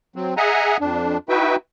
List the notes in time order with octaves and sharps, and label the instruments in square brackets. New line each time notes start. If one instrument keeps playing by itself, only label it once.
[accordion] F#3 C4
G#4 D#5 E5 F#5 G#5 A#5
F2 D4
D#4 E4 F#4 B4 E5 G5